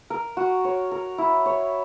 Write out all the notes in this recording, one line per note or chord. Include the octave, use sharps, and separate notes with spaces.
A#4
F#4
C#5
A#4
E4
C#5